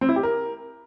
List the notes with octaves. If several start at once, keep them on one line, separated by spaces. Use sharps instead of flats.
C4
E4
G4
A#4